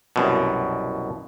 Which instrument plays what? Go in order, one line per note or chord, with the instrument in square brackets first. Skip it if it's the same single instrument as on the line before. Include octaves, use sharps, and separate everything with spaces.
[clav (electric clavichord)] C2 F#2 B2